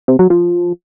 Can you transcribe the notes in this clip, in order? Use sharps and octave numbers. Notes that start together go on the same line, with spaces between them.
C3
F#3
F3